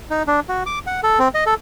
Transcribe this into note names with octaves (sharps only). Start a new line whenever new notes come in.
D#4
D4
F#4
D6
F#5
A4
C4
D#5
A4